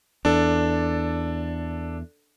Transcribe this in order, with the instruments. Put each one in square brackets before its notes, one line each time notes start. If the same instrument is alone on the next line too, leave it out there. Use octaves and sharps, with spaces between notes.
[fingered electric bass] E2 [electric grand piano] D4 A4